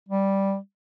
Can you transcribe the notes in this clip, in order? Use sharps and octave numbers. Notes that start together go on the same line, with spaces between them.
G3